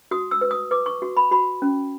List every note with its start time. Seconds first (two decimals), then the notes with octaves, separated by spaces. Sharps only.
0.11 F#4 D#6
0.31 E6
0.41 B4
0.51 D#6
0.71 B4 D6
0.86 C#6
1.02 F#4
1.17 B5
1.31 F#4 B5
1.62 C#4